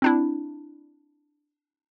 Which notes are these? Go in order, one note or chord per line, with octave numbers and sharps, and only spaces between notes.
C4 D4 E4